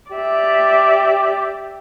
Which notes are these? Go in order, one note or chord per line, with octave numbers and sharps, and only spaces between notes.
G4 D5 E5